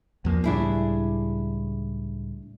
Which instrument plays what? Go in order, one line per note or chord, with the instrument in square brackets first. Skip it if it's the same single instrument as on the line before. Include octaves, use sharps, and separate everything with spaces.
[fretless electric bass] E2 F3 A#3
[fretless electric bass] C#2 A2 G3 [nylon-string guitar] D4 E4 G#4